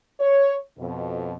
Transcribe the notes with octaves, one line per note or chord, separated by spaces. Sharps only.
C#5
F2 B2